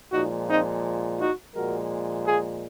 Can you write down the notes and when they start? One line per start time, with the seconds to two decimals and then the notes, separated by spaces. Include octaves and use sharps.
0.13 A#2 F3 G#3 D#4 F#4
0.49 C4 D#4
1.20 D#4 F#4
1.55 A#2 F3 G#3 F#4 A#4
2.26 F4 G#4